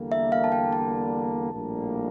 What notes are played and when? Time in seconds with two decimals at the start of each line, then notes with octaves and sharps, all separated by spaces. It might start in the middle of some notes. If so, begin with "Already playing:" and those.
Already playing: E2 D3 G3 A#3
0.12 E5
0.32 F5
0.44 A5
0.52 G5
0.72 A5
1.53 A#1 A2 G3 A#3